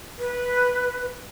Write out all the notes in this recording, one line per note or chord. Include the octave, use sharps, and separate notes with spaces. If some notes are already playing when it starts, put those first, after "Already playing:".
B4